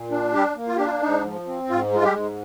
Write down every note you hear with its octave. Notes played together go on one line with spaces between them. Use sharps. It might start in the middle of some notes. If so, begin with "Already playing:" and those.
Already playing: A#2
D4
G3 G4
A#3
F4
D4 G4
F4
G#2 D#4
F3
C4
G#2 F4
G#3 F4
G3 G4
G#2